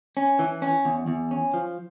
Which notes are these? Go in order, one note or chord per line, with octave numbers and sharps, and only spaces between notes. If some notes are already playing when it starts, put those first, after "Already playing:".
C#4
E3
C#4
E2
E2
C#4
F3